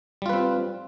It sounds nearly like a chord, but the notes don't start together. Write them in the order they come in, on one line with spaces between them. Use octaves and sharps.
G3 F4 B4 C4